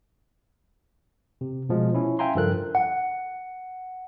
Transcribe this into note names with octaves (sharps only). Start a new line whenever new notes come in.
C3
B2 F3 G#3
C#4 E4
E5 F5 G5 G#5 A#5 C6
G2 C#3 F3 A4 A#4 F#6
F#5